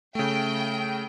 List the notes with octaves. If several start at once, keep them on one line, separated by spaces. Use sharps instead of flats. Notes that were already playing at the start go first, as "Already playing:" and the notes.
C#3 A3 G5